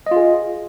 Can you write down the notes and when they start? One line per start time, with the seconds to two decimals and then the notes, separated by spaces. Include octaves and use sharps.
0.06 D#5
0.11 F4
0.16 G#4